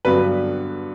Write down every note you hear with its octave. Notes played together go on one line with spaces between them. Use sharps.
G2 D3 F#3 B3 B4